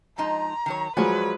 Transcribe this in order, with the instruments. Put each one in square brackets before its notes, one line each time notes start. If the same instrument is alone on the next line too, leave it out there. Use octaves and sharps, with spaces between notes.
[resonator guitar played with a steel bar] F3 G#3 D#4 [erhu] A#5
[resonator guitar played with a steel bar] D#3 F#3 C#5
[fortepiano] F3 F#3 G#3 [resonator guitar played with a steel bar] F#4 D5 G#5 [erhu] B4